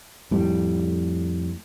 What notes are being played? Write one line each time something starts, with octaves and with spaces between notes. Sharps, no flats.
F2 A2 G3